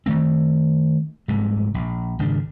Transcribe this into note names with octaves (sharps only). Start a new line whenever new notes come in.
D#3 A3 C4
F1 G#2 C3 G3
A#1
G#1 C#3 D4